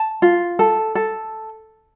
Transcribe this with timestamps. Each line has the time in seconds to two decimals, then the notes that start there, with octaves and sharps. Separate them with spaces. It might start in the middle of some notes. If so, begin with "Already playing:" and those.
Already playing: A5
0.22 F4
0.59 A4
0.95 A4